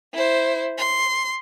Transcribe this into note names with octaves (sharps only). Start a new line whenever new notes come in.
E4 C5
C6